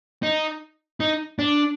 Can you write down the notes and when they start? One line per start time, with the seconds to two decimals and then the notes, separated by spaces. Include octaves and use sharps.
0.23 D#4
1.00 D#4
1.39 D4